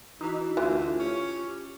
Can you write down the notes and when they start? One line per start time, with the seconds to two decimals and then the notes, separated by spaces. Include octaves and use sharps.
0.21 E3 D#4 F#4
0.57 D2 E3 F4
0.99 C#4 G4